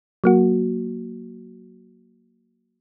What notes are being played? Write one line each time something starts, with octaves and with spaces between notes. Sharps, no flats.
F#3 A#3 F#4